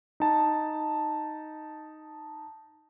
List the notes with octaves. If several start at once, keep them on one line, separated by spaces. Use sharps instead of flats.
D#4 A5